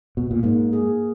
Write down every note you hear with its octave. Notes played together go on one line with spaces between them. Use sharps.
B2
A#2
G#2 A#3
G#4